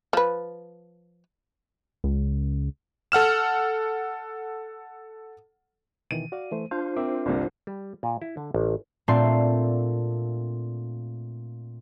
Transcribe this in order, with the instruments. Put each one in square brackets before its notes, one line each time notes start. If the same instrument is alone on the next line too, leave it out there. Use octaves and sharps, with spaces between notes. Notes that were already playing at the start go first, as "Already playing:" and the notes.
[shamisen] F3 B4
[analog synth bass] C#2
[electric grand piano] A4 F#5 F6 E7
[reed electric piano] B2 D#3 E3 [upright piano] D#7
[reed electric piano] F#4 D5 F5
E3 A3 C5
[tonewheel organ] D4 F4 C5 [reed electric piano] F5
[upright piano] C4 [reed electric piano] A#4 E5 D6
[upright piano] G1 C2 C3
[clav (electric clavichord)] G3
A#2
E4
D3
A1
[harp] A#2 A3 C4 D4 C6 C7